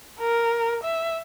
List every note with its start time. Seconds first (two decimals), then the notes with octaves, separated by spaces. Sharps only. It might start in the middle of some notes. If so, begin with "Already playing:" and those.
0.19 A#4
0.83 E5